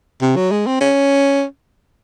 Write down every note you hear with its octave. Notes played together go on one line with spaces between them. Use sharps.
C3
F#3
G#3
C4
C#4